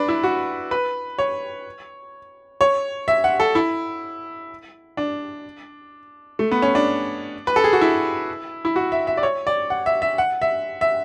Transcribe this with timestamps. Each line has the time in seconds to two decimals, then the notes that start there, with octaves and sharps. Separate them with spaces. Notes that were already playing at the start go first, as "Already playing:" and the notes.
Already playing: D4 B4
0.08 E4
0.23 F#4
0.71 B4
1.18 C#5
2.61 C#5
3.08 E5
3.24 F#5
3.40 A4
3.55 E4
4.97 D4
6.39 A3
6.51 B3
6.62 C#4
6.75 D4
7.47 B4
7.56 A4
7.64 G#4
7.73 F#4
7.81 E4
8.65 E4
8.76 F#4
8.92 E5
9.07 E5
9.17 D5
9.23 C#5
9.47 D5
9.70 F#5
9.86 E5
10.02 E5
10.18 F#5
10.42 E5
10.81 E5